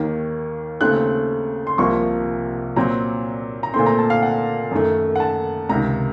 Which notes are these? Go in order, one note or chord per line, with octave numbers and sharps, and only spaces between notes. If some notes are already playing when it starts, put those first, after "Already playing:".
Already playing: D#2 D#3 A#3
D#2 C#3 A3 C4 F#6
C6
C2 C3 F3 A#3 C#6
A#2 F#3 C4 A#5
A#5
A#2 A3 C4 C6
A#5
A5
F5
F#5
F#2 D#3 A3
F#5
A5
C#2 C3 D#3 A#5